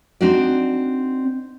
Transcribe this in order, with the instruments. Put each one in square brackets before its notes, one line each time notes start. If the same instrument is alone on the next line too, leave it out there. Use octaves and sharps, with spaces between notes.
[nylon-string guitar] C4 D4 D#4 F#4 D5